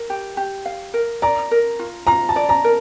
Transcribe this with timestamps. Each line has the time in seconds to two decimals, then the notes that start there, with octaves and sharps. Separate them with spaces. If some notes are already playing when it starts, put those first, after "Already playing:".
Already playing: A#4
0.10 G4
0.37 G4
0.65 F5
0.94 A#4
1.22 D5 A#5
1.51 A#4
1.79 F4
2.07 F4 A#5
2.29 A5
2.36 D5
2.49 A#5
2.64 A#4